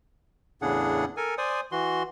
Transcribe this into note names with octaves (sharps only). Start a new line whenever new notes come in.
E2 A2 C#3 D4 G#4 F#5
A4 A#4 G#5
C5 D5 G#5 D#6
E3 F#4 C6